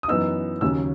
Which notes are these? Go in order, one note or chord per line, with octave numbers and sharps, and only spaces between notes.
D#6
F#2 E3 B3 D#4 E6
D#2 C#3 F#3 C#4 E6